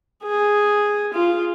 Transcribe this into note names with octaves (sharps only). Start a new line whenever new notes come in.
G#4
F4